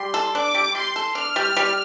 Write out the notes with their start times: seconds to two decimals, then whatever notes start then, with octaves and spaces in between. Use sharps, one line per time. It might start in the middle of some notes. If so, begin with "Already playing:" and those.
Already playing: G3 C6
0.14 A4
0.34 D4 D6
0.54 G3
0.75 G3 C6
0.96 A4
1.15 D4 F6
1.36 G3
1.57 G3